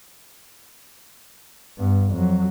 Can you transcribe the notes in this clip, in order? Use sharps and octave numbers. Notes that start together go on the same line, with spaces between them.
G2 B3
F2 F#3